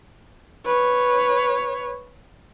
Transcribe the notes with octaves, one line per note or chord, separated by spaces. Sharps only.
B4 C#5